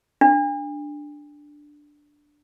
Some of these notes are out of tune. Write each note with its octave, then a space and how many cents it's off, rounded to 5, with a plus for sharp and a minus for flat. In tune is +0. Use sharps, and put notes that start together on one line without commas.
D4 +5